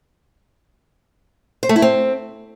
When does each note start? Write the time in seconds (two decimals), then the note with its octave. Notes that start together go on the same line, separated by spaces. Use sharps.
1.63 C5
1.69 A3
1.76 E4
1.82 C4